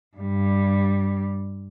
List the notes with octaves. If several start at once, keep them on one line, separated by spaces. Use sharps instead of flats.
G2 G3